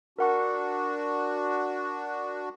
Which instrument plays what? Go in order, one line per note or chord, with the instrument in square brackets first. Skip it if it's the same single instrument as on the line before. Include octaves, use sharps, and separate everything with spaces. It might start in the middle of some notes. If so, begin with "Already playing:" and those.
[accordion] D4 F#4 [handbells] A#4 F#5 C#6